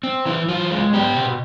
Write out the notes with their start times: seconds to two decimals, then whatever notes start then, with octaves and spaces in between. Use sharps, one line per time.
0.03 C4
0.25 E3 E4
0.48 E3 F4
0.71 G#3
0.93 B3 G4
1.15 B2